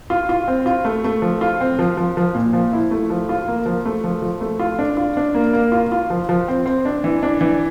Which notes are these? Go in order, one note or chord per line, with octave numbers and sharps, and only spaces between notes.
F4
F4
C4
F4
A3
A3
F3
F4
C4
F3
F3
F3
A#2
F3
E4
A3
F3
F4
A#3
F3
A3
F3
F3
A3
F4
D4
F4
D4
A#3
A#3
F4
F4
F3
F3
C4
C4
D4
E3
D4
E3